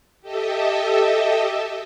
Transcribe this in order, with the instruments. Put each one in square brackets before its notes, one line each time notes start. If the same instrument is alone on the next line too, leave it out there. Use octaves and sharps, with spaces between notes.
[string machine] G4 A4 D#5 E5